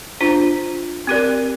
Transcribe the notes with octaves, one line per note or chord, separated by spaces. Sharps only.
D4 F4 C5
C4 G4 A#4 D5